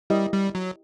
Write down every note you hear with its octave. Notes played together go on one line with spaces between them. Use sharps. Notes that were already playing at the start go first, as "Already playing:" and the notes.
G3 E4 G4 A#4 D#5
G3
F#3